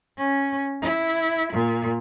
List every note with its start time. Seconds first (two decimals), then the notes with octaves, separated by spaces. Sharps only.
0.18 C#4
0.82 E4
1.53 A#2